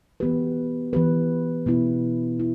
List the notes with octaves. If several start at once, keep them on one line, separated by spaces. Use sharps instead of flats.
E3 B3 G4 B4
E3 B3 G4 B4
B2 B3 E4
E4